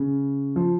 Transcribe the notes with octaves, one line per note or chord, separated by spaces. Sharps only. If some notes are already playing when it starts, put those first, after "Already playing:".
Already playing: C#3
F3